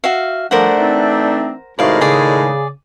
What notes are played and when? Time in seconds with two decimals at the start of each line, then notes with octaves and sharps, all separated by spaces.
0.04 F#4 E5 F5
0.51 F3 G3 A3 D4 A#4 C5 F#5
0.77 E3 C4 D#4
1.79 A2 C3 D#3 G#3 D#4 F#4 D5 F5
2.01 C#3 G#4 D5 D6